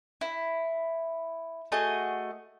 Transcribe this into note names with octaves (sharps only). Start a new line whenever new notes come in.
E4
A3 F#4 G#4 D#5